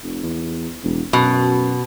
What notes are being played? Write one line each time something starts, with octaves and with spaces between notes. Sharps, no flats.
F1
E2
E1
F#2 B2